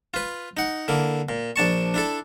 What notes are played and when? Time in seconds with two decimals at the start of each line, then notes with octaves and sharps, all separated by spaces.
0.14 F4 B4
0.57 D#4 F#5
0.88 D3 A#3 E4
1.29 A#2
1.56 A#1 D4 A5 C#6
1.94 D4 E4 A4